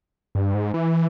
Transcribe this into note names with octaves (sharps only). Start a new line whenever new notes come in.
G2
G#2
E3